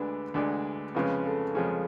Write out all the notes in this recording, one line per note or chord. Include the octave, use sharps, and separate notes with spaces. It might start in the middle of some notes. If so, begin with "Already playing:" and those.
Already playing: D2 D3 G#3 D4 B4
D2 D3 G#3 D4
F2 C#3 F3 G#3 C#4 B4
A4
F2 C#3 F3 G#3 C#4 G#4